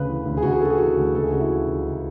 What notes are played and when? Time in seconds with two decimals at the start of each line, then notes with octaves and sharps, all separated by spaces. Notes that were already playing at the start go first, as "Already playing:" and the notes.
Already playing: D2 C#3 B4
0.08 E3
0.25 D2
0.37 G#4
0.43 D2 F#4
0.52 G#4
0.60 C#3 A4
0.65 F#4
0.70 G#4
0.78 E3 F#4
0.97 D2
1.14 C#2 A4
1.23 G#4
1.32 C#3 F#4
1.40 E4
1.49 E3
1.67 C#2
1.85 C#2